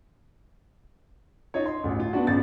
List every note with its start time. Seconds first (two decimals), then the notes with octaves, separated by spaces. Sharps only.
1.54 D#4 F4 C#5
1.66 C6
1.84 A1 D2
2.00 F4
2.13 B3 D4 F#4
2.27 A1 C#3 F#4 A6